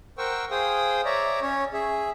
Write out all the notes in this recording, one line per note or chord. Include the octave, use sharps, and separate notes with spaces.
A#4 C5 F#5 G5 C#6 E6
G#4 C5 F5 G5 D#6
C#5 D5 E5 A#5
C#4 C#5
G#4 E5